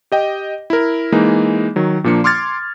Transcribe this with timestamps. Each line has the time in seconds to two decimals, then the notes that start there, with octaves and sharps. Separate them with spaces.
0.12 G4 D#5 G5
0.70 E4 A#4
1.12 E3 G#3 A#3 D#4
1.76 D#3 F#3
2.04 A#2 F3 A#3 D4 C#7
2.24 C6 D6 F6 G#6 A6